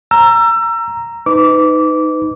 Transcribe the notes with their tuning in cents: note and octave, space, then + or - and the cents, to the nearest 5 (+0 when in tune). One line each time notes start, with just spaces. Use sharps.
A#5 +0 E6 +30
D#4 +0 B4 +30 D6 -20